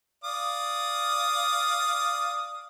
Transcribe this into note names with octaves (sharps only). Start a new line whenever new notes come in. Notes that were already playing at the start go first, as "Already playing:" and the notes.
D5 F5 D#6